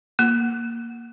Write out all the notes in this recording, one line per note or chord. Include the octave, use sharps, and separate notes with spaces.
A#3